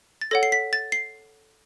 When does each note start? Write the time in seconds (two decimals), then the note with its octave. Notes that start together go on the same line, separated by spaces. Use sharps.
0.21 A6
0.31 A4 C#5 F#5 A#6
0.43 C7
0.52 B6
0.73 A6
0.92 C7